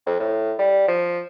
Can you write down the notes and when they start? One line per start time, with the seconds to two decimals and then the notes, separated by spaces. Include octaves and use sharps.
0.06 F2
0.19 A2
0.59 G3
0.88 F3